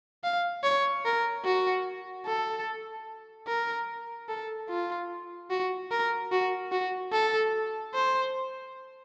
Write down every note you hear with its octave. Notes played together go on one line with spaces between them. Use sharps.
F5
C#5
A#4
F#4
A4
A#4
A4
F4
F#4
A#4
F#4
F#4
A4
C5